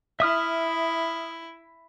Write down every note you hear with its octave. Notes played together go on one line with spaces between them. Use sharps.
E4 E5 D#6 F6